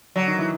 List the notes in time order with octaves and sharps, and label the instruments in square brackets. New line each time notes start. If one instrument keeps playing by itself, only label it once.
[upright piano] D3 D4 [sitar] F#3
[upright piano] D#3 D#4
E3 E4